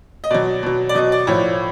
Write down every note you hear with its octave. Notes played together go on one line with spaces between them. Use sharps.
D#5
B2 F#3 D5
B2 F#3
D5
B2 F#3 D#5
D5
A2 F3 C#5